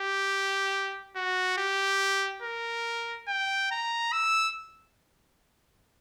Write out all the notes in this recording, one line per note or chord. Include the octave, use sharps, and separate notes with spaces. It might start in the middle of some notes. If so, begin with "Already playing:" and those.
Already playing: G4
F#4
G4
A#4
G5
A#5
E6